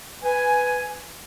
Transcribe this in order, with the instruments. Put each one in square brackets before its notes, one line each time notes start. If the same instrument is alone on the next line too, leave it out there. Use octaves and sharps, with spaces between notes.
[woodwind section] B4 G#5